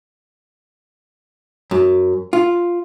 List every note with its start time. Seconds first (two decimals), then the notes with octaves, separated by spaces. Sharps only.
1.71 F#2
2.33 F4